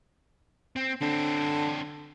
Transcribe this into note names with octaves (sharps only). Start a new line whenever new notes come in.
C4
D3 C4 D4